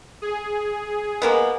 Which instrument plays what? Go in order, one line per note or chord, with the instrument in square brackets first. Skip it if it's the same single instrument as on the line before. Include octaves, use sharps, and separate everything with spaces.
[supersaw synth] G#4
[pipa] G#3 A#3 B3